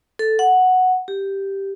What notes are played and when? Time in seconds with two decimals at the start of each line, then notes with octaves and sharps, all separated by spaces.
0.19 A4
0.39 F#5
1.08 G4